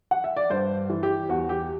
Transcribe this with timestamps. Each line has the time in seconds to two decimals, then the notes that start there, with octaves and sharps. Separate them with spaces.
0.11 F#5
0.24 E5
0.37 D5
0.50 G2 C5
0.90 E3
1.03 G4
1.29 E2 F#4
1.49 G4